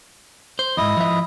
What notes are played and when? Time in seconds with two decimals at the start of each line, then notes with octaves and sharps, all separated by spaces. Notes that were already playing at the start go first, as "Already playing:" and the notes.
0.59 C5
0.77 E2 G#2 E4 D#5 D#6
0.97 F3 E5